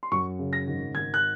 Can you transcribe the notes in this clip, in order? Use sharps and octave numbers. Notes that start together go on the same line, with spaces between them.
C6
F#2 C#6
C#3
A#6
G#1
G#1 G#6
F#6